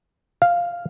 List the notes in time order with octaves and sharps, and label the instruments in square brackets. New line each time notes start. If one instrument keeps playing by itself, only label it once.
[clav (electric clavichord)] F5